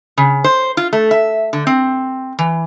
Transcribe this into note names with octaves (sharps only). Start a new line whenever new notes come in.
C#3
C5
F4
A3
E5
D3
C4
E3